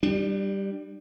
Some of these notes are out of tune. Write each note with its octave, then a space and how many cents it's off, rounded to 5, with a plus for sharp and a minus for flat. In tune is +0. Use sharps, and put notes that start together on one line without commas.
G3 +0 D4 +35